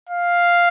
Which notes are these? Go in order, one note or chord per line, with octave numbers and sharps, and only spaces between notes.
F5